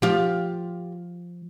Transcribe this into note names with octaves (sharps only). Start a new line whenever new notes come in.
F3 F4 G4